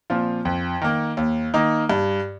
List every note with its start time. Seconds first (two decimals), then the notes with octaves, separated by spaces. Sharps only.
0.10 A#2 F3 C4 F4
0.45 F2
0.82 D#3 A#3
1.17 D#2
1.54 D#3 A#3 D#4
1.89 G2